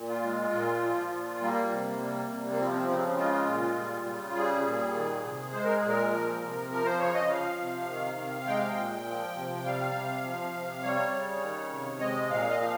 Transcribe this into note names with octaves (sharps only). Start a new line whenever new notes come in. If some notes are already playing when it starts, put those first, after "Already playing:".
Already playing: A#2
F4
G#3
A#2
F3
A#2
G3 A#3
C3
G3
C3
A#3
F3 C4
C4
C#3 C4
G#3 F4
A#2
G3
C#3
G3 G#4
A#2
D#3
C3
G#3 C5
A#4
G#4
A#2
A#4
F3
C3
F3 A#4
C5
C#3 C#5
D#5
F3 F5
C3
D#3
C3
G#3 G5
F5
G5
A#2
F3
C3
G3 F5
C3
F3
C3
G3 C#5
C#3
D#3
C3
G#3 D#5
A#2 F5
D#5
F3 F5